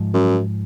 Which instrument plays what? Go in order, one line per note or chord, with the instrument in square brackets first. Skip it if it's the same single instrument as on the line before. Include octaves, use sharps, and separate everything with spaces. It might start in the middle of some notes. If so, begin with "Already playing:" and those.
Already playing: [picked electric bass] G#2 F3 G#3
[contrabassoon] F#2